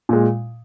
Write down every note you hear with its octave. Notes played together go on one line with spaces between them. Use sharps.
A#2 G#3